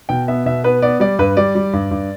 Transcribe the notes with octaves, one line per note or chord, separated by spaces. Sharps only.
B2 G5
B3 E5
B2 E5
B3 B4
B3 D5
G3 D5
G2 B4
G3 D5
G3
G2
G2